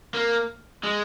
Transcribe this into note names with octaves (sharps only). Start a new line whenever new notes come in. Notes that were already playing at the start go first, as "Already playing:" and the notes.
A#3
G#3